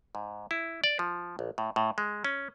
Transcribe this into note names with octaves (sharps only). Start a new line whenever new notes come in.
G#2
E4
D5
F3
A#1
A2
A2
G#3
C#4